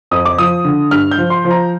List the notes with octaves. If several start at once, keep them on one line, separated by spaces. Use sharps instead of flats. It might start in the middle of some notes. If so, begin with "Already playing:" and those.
F2 D#6
D6
F3 D#6
D3
G2 F6
G6
F3
C6
F3
A#5